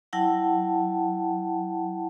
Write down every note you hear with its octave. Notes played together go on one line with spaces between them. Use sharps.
F#3 E4 F#5 G5 A5